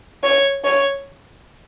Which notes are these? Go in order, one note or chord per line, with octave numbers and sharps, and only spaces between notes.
C#5
C#5